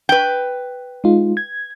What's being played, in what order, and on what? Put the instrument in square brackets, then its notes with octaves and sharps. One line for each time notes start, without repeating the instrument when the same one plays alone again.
[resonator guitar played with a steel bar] B4 G5
[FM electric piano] G#3 D#4 F4
G#6